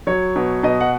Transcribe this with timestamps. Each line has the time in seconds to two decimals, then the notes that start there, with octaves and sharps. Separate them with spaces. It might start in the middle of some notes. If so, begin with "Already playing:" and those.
0.07 F#3 C#5
0.36 B2
0.63 B2 D#5
0.81 F#5